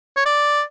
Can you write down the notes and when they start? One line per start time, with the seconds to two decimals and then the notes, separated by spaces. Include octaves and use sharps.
0.17 C#5
0.26 D5